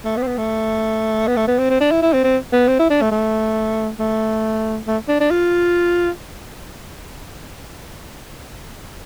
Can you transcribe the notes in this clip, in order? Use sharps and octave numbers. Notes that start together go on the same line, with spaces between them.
A3
B3
C4
B3
A3
B3
A3
B3
C4
C4
D4
E4
E4
C4
C4
B3
C4
E4
D4
A3
A3
A3
A3
D4
D4
F4